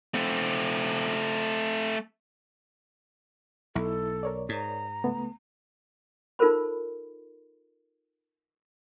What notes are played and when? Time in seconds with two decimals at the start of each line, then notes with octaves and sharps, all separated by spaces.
0.14 A3 C4
3.75 B1 E4 A4
4.23 A#4 C#5 D5
4.49 G#2 A#5
5.04 C#2 A3 B3
6.39 D#4 F4 A4 A#4 C5 B5